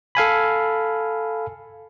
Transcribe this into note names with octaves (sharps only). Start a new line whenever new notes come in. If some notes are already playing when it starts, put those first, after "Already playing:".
A4 F5 G#5 B5